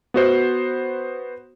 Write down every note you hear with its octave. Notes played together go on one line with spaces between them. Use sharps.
B3 F#4 C5